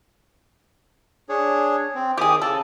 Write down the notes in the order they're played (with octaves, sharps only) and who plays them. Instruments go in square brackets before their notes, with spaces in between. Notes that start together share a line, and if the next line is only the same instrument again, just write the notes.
[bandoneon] D4 G#4 C#5
C4
[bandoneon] D#3 D6 D#6 [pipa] G4 G#4
[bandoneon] C#3 [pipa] A4